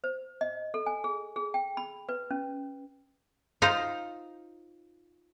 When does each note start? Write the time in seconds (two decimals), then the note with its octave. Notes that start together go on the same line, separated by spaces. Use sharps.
0.04 C5
0.41 D#5
0.74 A4
0.86 G#5
1.04 G#4
1.36 G#4
1.54 G5
1.77 B5
2.09 B4
2.31 C#4
3.62 D#4 F4 C5